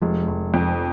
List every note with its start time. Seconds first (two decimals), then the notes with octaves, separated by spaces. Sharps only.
0.02 F1 F3 G#3
0.28 F1
0.54 F2